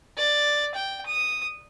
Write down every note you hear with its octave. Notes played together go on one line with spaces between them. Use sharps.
D5
G5
D#6